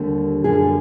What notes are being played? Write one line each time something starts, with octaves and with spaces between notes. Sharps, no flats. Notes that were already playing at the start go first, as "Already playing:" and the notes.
Already playing: D#2 D3 G3
F#2 D3 G3 G#4